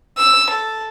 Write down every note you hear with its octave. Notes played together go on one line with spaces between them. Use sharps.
E6
A4